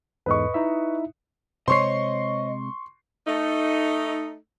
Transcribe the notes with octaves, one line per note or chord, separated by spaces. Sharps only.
E2 G#2 A4 B4 D#5 C#6
D#4 E4 E5
C3 G#3 C5 C#5 D#5 C6 C#6 C7
A3 D#4